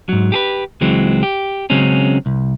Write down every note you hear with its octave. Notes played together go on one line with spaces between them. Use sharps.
G#2 F#3
G4 G#4 B4
C#2 E3 F#3 G#3 C4
G4
C#3 F#3 G#3 C4 C#4
C2